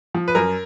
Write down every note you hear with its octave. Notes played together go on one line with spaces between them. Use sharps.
F3
B4
F#2 A#4